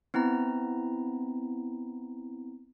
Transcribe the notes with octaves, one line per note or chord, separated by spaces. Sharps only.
B3 C4 E4 A#5